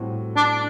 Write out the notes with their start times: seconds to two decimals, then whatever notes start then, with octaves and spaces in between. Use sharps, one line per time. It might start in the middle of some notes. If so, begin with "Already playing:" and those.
Already playing: A2 G3 C4 F#4
0.36 D4